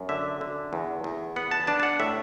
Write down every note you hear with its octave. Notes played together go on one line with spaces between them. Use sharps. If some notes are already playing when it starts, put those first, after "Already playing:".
Already playing: F#2
D3 E5
D3
E2
E2
B3 F#5
A5
D4 A5
A5
F#5
A2 E5